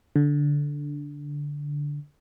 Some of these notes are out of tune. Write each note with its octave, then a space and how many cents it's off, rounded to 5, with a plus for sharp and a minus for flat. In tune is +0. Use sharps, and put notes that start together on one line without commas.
D3 -10